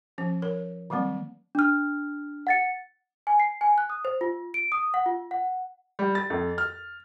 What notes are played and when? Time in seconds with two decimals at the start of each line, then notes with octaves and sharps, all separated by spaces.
0.18 F3 C#4
0.42 A#4 C#5
0.90 D#3 F#3 G3 A#3 C4
1.55 D4 F6
2.47 F#5 A6 C#7
3.27 G#5
3.40 C7
3.61 G#5
3.78 F#6
3.90 D#6
4.05 C5
4.21 F4
4.54 D7
4.72 D#6
4.94 F#5
5.06 F4
5.31 F#5
5.99 G3
6.15 A6
6.30 F2
6.58 F6